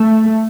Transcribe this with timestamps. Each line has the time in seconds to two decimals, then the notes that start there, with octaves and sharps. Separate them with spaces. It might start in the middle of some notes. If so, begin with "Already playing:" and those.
Already playing: A3